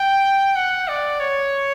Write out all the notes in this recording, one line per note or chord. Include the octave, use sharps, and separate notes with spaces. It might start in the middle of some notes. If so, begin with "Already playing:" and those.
Already playing: G5
F#5
D5
C#5